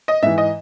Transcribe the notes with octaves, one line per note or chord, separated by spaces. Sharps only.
D#5
G#2 E3 E5
D#5